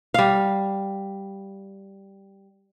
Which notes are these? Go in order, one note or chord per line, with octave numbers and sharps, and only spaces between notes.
G3 F5